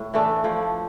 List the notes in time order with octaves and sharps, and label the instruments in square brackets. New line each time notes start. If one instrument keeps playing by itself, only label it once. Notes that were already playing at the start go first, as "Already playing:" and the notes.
Already playing: [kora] A2
E3 A3 D4 A4
F3 A3 E4